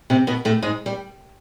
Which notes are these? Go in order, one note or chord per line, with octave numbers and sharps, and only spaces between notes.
C3 C4
B2 B3
A2 A3
G#2 G#3
G3